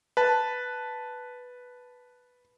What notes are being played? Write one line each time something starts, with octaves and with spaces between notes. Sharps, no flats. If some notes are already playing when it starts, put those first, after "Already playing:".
B4 A5